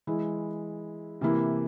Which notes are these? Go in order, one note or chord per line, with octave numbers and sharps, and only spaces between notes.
E3 G#3 E4
C3 E3 A#3 E4